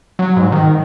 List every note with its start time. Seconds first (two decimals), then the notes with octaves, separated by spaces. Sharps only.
0.19 F#3
0.36 G#2
0.52 D#3